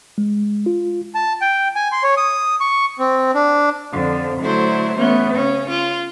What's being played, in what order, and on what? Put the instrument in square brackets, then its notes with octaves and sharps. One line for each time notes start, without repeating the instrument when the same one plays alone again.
[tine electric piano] G#3
F4
[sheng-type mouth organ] A5
G5
G#5
C6
C#5
D#6
C#6
C4
D4
[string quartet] F2 D3 F3
D3 F#3 A3 E4 C5
E3 A3 B3 C#4
C#3 C#4
F4